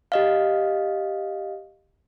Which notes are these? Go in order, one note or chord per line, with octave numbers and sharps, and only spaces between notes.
G4 D#5 F5